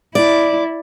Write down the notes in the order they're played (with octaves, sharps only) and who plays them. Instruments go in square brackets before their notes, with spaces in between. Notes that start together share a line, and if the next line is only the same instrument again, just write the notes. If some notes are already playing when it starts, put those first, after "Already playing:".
[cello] E4 [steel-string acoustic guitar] D5